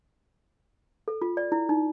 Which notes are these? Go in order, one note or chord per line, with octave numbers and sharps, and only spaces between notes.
A4
F4
D5
E4
D#4